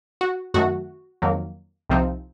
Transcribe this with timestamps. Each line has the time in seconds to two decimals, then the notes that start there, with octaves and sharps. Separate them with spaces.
0.21 F#4
0.54 F#2 D#3 A3 F#4
1.22 F2 D#3 F#3 A#3
1.89 C2 C3 F3 C4 D#4